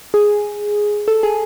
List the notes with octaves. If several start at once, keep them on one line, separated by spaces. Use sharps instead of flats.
G#4
A4
G#4